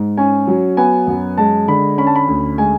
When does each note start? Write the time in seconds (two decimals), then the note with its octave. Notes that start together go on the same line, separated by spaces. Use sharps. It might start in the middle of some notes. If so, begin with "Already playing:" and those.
Already playing: G#2
0.17 C#4 G#5
0.47 F#3
0.77 B3 G#5
1.07 F#2
1.38 G#3 A5
1.68 D3 B5
1.98 C#4 B5
2.07 A5
2.15 B5
2.28 D2
2.58 G#3 G#5